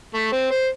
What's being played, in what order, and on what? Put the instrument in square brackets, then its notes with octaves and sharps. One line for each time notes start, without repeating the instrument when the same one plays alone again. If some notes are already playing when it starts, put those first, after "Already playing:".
[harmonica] A3
C4
C5